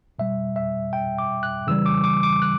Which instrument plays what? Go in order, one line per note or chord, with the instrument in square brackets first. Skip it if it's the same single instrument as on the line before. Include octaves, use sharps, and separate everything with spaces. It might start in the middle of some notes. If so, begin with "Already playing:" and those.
[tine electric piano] B2 G3 E5
E5
G5
D6
F#6
C#3 E3 G3 E6
D6
D6
D6
F#6